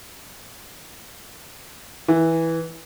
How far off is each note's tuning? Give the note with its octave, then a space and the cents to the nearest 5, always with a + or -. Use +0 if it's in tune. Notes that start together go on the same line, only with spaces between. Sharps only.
E3 -10